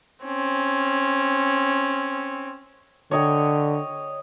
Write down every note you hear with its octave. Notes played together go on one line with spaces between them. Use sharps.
C4 C#4
D3 C#5 D#5 G5